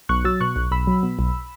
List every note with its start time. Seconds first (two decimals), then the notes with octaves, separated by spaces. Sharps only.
0.09 B1 C#6 F#6
0.25 F#3 E6 A6
0.40 B2 C#6 F#6
0.56 B1
0.71 B1 B5 E6
0.87 F#3
1.03 B2
1.19 B1